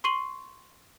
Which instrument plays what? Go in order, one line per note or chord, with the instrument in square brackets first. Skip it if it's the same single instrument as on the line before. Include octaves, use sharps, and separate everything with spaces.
[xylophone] C6 C#6 C7 D#7 F#7 G7